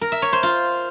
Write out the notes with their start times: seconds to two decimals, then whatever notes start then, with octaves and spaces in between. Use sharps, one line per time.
0.01 A#4
0.12 E5
0.22 C#5
0.33 C5
0.43 F4